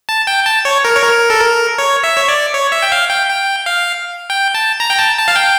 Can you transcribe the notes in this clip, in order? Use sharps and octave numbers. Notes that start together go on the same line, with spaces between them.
A5
G5
A5
C#5
A#4
C#5
A#4
A4
A#4
C#5
E5
C#5
D5
C#5
E5
G5
F5
G5
G5
F5
G5
A5
A#5
G5
A5
A5
F5
G5